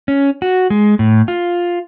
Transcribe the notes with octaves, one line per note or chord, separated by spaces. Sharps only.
C#4
F#4
G#3
A2
F4